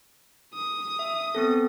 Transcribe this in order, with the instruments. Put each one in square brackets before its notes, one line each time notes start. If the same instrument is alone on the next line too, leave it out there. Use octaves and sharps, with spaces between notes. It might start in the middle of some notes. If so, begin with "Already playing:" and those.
[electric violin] D#6
[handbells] E5
B3 C4 A4